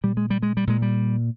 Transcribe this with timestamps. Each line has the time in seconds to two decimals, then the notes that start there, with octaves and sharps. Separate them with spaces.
0.04 A#2 G3
0.17 G#3
0.30 G3
0.42 G#3
0.57 G3
0.67 A#2 G#3
0.82 G3